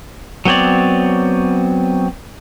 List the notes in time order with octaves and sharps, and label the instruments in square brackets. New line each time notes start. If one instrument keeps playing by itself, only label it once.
[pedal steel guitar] F#3 B3 C4 C#5 D5